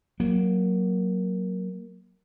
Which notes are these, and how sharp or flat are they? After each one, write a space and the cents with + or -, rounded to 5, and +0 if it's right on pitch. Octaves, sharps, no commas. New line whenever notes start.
F#3 +0 A#3 +5